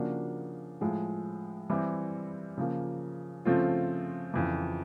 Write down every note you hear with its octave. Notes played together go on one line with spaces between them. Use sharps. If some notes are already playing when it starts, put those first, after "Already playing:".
Already playing: C#3 F3 A#3 D4 F#4
A2 F3 G#3
E3 G3 C4 E4
C#3 F3 A#3
C#3 F3 A3 C4 F4
F2 C#3 E3